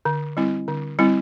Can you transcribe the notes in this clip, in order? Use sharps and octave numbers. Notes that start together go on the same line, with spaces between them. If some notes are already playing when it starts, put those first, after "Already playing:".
D3
G3 C4 E4
D3
G3 C4 E4